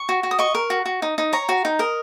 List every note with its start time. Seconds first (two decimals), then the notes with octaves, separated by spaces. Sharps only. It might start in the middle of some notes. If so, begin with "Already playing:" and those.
Already playing: C#6
0.09 F#4
0.23 F#4
0.31 D#6
0.39 D#5 C#6
0.55 A#4
0.70 F#4
0.86 F#4
1.02 D#4
1.18 D#4
1.33 C#5 A#5
1.49 F#4
1.65 D#4
1.79 A#4 D#5